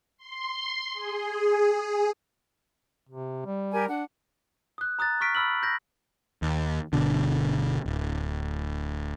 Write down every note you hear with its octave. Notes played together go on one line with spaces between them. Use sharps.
C6
G#4
C3
G3
G4 A#4 G#5
D4 F#5
D#6 F#6
A#5 D#6 F#6 A6
C#6 F6 B6 D7
B5 E6 F6 F#7
G6 A#6
D#2
G1 C2 B2 D3
D1